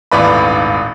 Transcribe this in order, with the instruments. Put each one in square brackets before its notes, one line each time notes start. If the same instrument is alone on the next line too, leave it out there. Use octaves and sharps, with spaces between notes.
[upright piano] D#1 G#1 A2 B4 D5 B5